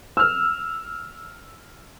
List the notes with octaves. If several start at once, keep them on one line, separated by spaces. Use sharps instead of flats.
E6 F6